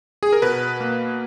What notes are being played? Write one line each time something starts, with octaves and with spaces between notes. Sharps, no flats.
G#4
A#4
B2 B4
A#3